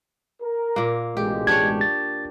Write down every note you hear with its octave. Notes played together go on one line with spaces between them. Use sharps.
A#4
A#2 A#3
A1 B2 G#3 G4
D4 G4 C#5 G#6
A6